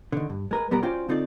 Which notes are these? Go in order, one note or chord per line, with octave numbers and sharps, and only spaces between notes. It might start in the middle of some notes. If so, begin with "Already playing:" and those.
D3 D#3
G2
G#3 A#4 B4
B1 G3 B3 G4 A#4 A#5
C#4 F4 F#4 C5 D5 G5
D3 C4 D#4 F4 A4 D5